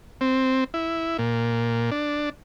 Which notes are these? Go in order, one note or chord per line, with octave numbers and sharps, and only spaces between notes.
C4
E4
A#2
D4